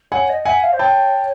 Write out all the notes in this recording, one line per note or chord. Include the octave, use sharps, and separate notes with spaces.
C#5 F#5 G#5
D#5
D#5
E5 F#5 G#5
F5
C5
C#5 G5 A5